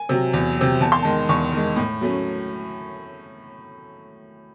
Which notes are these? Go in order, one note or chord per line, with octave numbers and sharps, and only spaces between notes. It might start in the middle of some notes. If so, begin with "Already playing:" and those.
Already playing: G#5
C3 F#3
E2
C3 F#3
E2 A5
C6
D#3 G#3 A5
E2 C#6
D#3 G#3
A2
F#3 A3 C#4